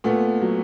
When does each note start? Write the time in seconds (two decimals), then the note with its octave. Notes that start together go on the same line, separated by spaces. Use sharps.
0.04 A#2 A3 B3
0.42 F#3